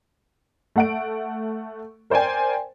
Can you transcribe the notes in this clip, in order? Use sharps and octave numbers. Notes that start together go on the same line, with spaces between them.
A3 F#5 D7
A#4 C5 D5 G5 G#5